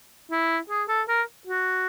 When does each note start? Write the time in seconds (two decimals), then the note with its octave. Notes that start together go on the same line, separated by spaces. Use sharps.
0.31 E4
0.70 G#4
0.88 A4
1.08 A#4
1.47 F#4